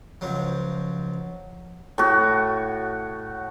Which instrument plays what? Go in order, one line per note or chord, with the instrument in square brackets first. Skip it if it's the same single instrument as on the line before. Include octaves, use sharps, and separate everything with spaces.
[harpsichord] C#2 F3 F#3
[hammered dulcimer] A2 F#4